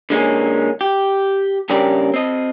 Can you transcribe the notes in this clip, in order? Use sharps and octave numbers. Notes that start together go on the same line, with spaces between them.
D3 G#3 A#3 C#4
G4
G2 C#3 C#4 G4 A#4 D5
C4 D#5